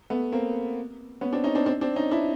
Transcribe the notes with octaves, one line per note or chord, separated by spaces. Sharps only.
A3 B3
A#3 C4
B3 C#4
C4 D4
C#4 D#4
C4 D4
C4 D4
C4 D4
C#4 D#4
D4 E4